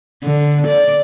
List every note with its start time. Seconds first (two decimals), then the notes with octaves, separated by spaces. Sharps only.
0.23 D3
0.68 D5